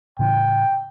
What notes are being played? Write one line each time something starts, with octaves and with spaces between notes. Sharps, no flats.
A2 C#3 E3 G5